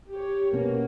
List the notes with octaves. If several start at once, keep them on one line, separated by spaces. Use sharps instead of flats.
G4 C#5
B2 A#3 B3 C#4